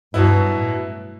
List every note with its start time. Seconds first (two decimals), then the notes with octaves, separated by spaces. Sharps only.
0.14 G2 B2 F#3 B3 E4
0.55 A2